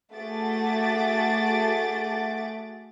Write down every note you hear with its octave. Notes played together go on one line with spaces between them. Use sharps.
A3 F#4 G#4 D6 A6